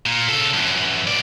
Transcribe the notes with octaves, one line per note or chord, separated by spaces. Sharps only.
A#2
C#3 A4
F#2 E3
B2 D5